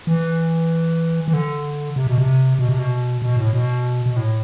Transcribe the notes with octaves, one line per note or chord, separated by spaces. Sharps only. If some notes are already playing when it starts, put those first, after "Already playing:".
E3
E3
D3
C3
B2
C3
B2
C3
B2
B2
A2
B2
B2
A2